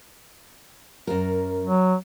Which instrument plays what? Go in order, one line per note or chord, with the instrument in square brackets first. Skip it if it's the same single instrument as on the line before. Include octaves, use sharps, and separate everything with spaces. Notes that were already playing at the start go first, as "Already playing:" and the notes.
[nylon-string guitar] F#2 A#4
[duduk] F#3